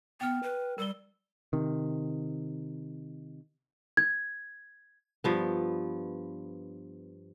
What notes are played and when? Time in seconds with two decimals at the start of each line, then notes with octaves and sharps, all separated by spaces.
0.21 B3 G5 F6
0.43 B4
0.78 G3 A#4 E6 G7
1.53 C3 D#3
3.97 G#6
5.24 G2 F3 B3